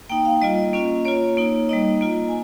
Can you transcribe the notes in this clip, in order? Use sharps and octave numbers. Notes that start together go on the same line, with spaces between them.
A#3 D#4 G5
F5
G3 A#3 F4 D#5
A#3 C#4 F4
A#3 F4 C#5
A#3 D#4
G3 A#3 D#4 D#5
A#3 F4
G#5